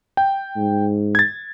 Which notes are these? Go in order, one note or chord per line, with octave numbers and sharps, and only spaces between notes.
G5
G#2
G#6 A6